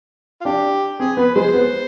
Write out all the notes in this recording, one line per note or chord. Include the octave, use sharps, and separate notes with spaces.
F4
D4 G4
C4 G#4
B3 B4
G#3 C5
B3